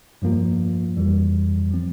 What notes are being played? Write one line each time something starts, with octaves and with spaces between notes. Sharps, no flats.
G2 F3 A#3 F4
F2 E3 G3
F3 C4